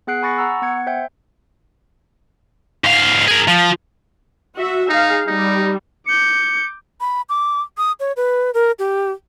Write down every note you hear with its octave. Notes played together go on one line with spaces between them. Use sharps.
B3 G#4 F#5 F#6 C7 D7
G#5 B5 C#6 A6 A#6 C#7
F#5 A#5 C#6 E6
B3 F#5 G#6 C#7
C5 E5 G5 G6
G#2 F5
G#4 A#4
F3
F#4 E5
D#4 G#4 F5
G3 D#4
D6 G6 C#7
B5
D6
D#6
C#5
B4
A#4
G4